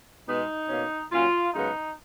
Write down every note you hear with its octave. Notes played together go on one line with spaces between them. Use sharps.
B2 G#3 B3 D#4
B2 A#3 C#4
A#2 F#3 C#4 F4
F#2 C#3 G#3 B3 D#4